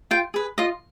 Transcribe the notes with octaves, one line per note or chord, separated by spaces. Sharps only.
F4 G5
G#4 B4
F4 D#5